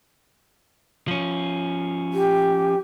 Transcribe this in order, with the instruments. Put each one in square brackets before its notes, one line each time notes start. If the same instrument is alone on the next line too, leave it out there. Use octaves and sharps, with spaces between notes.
[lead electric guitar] F3 C#4
[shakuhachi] G4